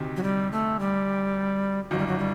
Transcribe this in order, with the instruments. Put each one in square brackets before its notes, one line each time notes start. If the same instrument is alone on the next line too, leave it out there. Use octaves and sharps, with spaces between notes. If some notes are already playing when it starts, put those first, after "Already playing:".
Already playing: [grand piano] D2 C3 D#3
[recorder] F#3
G3
A3
G3
[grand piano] G1 F#2 D#3 [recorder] F#3
[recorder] G3
F#3
G3